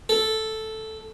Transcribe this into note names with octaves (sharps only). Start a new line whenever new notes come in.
A4